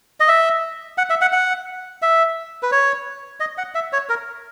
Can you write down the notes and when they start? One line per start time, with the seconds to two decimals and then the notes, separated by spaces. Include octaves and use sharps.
0.20 D#5
0.28 E5
0.98 F#5
1.10 E5
1.21 F#5
1.32 F#5
2.02 E5
2.63 B4
2.72 C#5
3.40 D#5
3.58 F#5
3.75 E5
3.93 C#5
4.09 A#4